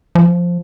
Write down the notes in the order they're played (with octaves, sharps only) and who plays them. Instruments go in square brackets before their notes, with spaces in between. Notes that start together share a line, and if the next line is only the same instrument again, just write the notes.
[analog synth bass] F3